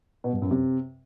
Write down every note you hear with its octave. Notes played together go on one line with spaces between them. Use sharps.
B2
G2
F#2
C3